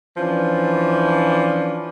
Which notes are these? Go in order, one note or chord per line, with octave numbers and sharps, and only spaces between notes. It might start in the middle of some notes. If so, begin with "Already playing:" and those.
E3 F3 C#4 D4